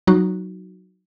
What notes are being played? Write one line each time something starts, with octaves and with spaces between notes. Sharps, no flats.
F#3 D#4 F#4